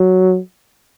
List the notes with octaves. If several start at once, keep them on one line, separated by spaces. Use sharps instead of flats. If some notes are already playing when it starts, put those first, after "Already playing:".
Already playing: F#3